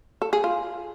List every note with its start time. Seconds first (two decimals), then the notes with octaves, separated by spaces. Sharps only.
0.22 A4
0.33 G#4
0.44 F4